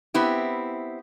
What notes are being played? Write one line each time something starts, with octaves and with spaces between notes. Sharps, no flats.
B3 C4 E4 G4